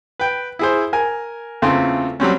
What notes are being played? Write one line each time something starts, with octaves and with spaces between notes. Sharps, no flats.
B4 G5
E4 G#4 C5
A#4 G#5
E2 C#3 A3 C4 F4 C6
F#3 G3 C4 C#4